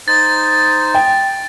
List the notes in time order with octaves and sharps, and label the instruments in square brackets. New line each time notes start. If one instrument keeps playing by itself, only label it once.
[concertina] D#4 C5 [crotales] A6
[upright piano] G5